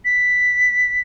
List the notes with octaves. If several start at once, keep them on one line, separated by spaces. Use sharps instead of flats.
B6